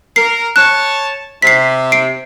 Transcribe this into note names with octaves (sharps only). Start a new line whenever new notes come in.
A#4 C7
C#5 A5 F#6
C3 B6 C7
C7 D7